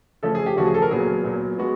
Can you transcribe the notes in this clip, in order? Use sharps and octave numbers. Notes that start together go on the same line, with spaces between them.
C#3 F3 A3 A4
G#4
G4
C#3 F3 A3 F#4
G#4
A4
A#4
A#2 F#3 B3 G#4
A#2 F#3 B3
G#3 B3 F#4